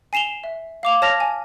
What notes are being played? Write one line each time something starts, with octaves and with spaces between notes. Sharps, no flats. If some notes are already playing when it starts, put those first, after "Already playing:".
G#5 C7 E7 F7 G7
E5
F5 D6 F7
C#5 A5 F6 A#6 B6 F7
G#5